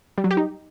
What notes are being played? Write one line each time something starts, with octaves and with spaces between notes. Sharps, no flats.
G3
F#3
G4
D#4